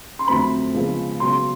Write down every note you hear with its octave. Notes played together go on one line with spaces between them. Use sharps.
C6
F2 D3 F#3 A3 C4 B5
C#3 F3 G#3 B3
C#3 F#3 B3 C6